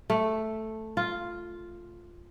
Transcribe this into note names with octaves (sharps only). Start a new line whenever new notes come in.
A3
F4